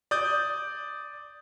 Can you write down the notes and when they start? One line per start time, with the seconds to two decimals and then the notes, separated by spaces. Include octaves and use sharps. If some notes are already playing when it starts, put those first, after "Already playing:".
0.11 D5 D6 D#6 G6